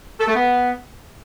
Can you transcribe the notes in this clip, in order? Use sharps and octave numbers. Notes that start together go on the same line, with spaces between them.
A4
A3
B3